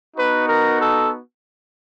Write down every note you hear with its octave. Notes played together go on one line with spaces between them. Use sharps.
B3 D#4 F#4 B4
A#4
A4